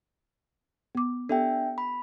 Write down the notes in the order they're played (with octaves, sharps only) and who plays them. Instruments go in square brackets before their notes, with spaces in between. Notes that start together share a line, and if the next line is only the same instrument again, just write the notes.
[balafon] B3 D6
[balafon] B3 G4 A4 [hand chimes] D4 E5 G5
[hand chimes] B5